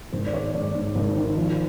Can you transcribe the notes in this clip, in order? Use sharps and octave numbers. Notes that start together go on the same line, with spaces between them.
G#1 C5
D5
D#3 C#5
G#1 D5
G#2
G#1
D#3
F3